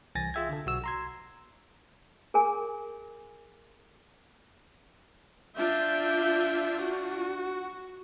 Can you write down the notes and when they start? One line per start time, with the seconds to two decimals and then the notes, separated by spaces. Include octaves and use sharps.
0.15 C2 E3 G#5 A6 A#6
0.34 F4 G#4 E5 G5 G#6
0.49 D3 A4
0.66 B1 F#4 E6
0.84 A#5 C6 G#6
2.34 G#4 A#4 G#5
5.56 D4 F4 E5 G6
6.82 F#4